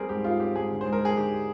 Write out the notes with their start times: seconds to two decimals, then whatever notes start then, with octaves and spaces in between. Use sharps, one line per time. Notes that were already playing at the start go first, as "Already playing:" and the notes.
Already playing: G3 C4 G#4 A#4
0.09 G#2 G4
0.24 G#2 F4
0.40 C4 G4
0.55 G#2 G#4
0.71 D3
0.81 G#3 C5
0.93 A#4
1.01 G#3 G#4
1.17 D3 G4